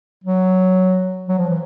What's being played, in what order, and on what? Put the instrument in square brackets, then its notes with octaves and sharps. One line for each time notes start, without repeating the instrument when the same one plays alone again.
[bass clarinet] F#3
F#3
F3
E3